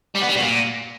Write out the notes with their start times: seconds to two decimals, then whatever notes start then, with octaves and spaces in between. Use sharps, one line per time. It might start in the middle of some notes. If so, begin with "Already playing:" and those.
0.15 G3
0.22 B3
0.28 G3
0.35 B2
0.42 A#2